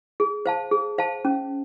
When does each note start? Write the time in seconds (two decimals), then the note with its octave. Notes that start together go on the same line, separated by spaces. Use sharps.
0.20 G#4
0.46 C5 F5 A5
0.71 G#4
0.98 C5 F5 A5
1.25 C#4